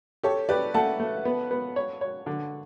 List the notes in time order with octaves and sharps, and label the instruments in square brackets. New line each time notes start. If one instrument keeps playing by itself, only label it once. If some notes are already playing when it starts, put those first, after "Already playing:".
[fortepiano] G4 [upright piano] A4 C#5
[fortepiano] G4 [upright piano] B4 D5
[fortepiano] A3 [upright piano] F#5 A5
[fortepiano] A3
B3
B3
C#5
C#5
D3